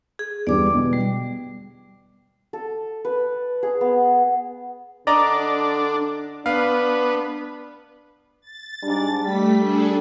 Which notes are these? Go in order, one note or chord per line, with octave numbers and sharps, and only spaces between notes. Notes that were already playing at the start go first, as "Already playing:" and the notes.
G#4
E2 D3 G3 D5 D6
B2
G3
A4
B4
G#4
B3
D3 D4 D5 D#5 A#5
B3 D4 F5
A6
G#2 G3 D4
G3 A3 B6
D4 G#4 A4